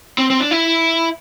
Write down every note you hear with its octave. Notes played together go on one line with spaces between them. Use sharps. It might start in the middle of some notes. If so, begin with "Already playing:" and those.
C4
C4
D4
E4